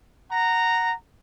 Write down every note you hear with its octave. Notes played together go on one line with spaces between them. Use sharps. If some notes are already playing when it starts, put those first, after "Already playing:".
F#5 A#5